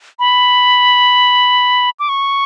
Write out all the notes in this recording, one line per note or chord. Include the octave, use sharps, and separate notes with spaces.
B5
D6
C#6